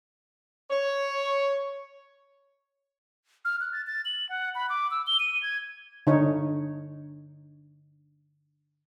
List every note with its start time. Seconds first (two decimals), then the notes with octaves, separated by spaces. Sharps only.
0.70 C#5
3.45 F6
3.61 F#6
3.72 A6
3.87 A6
4.05 F#7
4.29 F#5
4.55 B5
4.69 D6
4.91 E6
5.07 G7
5.20 D#7
5.43 G#6
6.07 D3 D#4 C#5